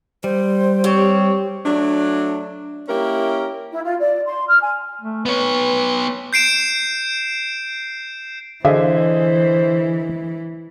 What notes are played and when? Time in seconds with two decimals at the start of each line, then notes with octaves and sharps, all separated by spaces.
0.24 G3 C5
0.84 C4 G4 C#5
1.65 F#3 A3 D4
2.88 A#3 C#4 E4 G4 A#4
3.71 E4
3.85 F4
4.00 D5
4.26 C6
4.48 F6
4.62 G#5
5.01 A3
5.26 B3 B4 C#5
6.33 G6 C7 D7 E7
8.65 D3 E3 G#4 C5 D#5 E5